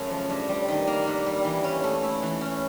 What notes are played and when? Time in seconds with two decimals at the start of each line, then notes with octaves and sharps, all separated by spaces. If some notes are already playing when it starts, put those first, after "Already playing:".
Already playing: F#2 C#3 A3
0.10 F3
0.30 G2
0.49 G3
0.68 D#3
0.87 A#3
1.07 G2
1.26 G3
1.45 E3
1.64 C#4
1.84 A3
2.03 E4
2.23 E3
2.41 C#4